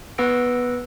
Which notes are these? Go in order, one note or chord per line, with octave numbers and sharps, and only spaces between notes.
B3 B4 F#5 E6 A#6 D7